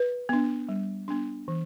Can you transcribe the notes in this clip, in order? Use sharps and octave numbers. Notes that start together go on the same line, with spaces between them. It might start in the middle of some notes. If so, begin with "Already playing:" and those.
Already playing: B4
B3 D4
G3
B3 D4
E3